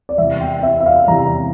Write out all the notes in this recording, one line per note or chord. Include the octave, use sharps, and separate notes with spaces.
D5
E2 C3 E3 E5
G5
E5
E5
F5
E2 C3 E3 A#5